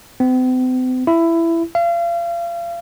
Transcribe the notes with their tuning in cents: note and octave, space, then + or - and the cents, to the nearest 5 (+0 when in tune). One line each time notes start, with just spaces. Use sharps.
C4 -45
E4 +15
F5 -35